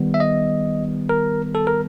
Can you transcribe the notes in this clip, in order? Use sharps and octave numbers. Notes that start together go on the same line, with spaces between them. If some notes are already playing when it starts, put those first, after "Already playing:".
Already playing: D#3 G3 B3
E5
D#5
A#4
A4
A#4